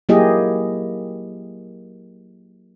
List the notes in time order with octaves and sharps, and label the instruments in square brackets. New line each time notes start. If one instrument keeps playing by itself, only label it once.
[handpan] F#3 A#3 E4 G4 G#4 D#5